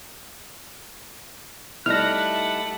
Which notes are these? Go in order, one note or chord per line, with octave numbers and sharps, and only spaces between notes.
G3 A3 D#4 E4 F#5 F6 F#6 A#6